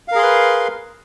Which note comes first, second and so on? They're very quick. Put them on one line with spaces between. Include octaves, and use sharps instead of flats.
F5 A#4 G#4 C6 B4